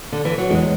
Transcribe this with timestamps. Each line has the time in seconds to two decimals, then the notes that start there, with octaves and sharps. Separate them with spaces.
0.12 D3
0.25 E3
0.38 F#3
0.50 E2 G#3